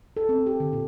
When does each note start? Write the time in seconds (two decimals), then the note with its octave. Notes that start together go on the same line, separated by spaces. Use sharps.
0.17 A4
0.29 C4
0.47 G4
0.60 D3
0.73 A#2